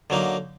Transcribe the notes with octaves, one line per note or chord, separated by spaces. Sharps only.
D3 F#3 A#3 D#4